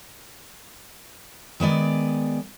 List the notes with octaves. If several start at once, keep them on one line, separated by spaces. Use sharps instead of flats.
D#3 G#3 B3 D5